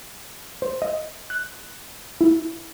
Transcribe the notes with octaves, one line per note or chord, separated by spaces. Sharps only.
C5
D#5
F#6
E4